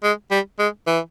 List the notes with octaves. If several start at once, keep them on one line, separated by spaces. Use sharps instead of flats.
G#3
G3
G#3
E3